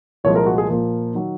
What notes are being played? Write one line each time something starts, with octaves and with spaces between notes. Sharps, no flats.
C2 A#2 F3 G#3 C#5
A#4
F#4
G#4
A#2 F3 A#3
D#3 F#3